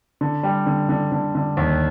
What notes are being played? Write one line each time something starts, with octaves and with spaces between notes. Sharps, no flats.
D3
G3
D3
D3
D3
D3
D#2